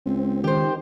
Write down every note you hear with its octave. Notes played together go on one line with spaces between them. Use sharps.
C#2 C4
D#3 G4 C5